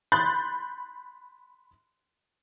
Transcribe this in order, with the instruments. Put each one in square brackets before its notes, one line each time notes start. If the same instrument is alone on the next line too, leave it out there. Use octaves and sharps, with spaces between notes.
[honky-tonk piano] B5 C6 F#6 G6 A6